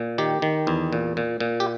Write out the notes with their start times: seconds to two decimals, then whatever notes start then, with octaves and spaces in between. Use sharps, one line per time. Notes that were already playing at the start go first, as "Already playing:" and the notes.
Already playing: A#2
0.18 D#3 G4
0.42 D#3
0.67 E2
0.93 A#2
1.17 A#2
1.40 A#2
1.60 G4